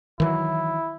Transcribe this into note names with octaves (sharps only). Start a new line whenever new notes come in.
D#3 E3 F#3 E4